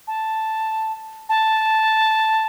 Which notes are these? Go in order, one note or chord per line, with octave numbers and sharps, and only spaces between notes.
A5
A5